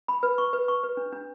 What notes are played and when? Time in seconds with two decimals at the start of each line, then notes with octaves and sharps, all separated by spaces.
0.08 B5
0.23 B4
0.38 C#6
0.53 B4
0.68 C#6
0.83 B4
0.97 D4
1.13 D4